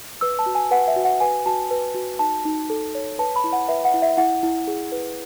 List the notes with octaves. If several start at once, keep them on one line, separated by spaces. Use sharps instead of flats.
B4 E6
A5
F#4
G#5
B4 F#5
E5
F#4
F#5
B4 G#5
F#4 A5
B4
F#4
D#4 A5
D#4
A4
C#5
B4 A5
B5
E4
F#5
B4 E5
F#5
E4
E5
E4 F#5
E4
G#4
B4